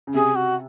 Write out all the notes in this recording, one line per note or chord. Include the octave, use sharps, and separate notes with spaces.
C#3
C3 G#4
F#4